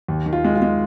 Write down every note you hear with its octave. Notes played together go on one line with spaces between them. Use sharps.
D#2
D#3
F4
G#3
F4
G#3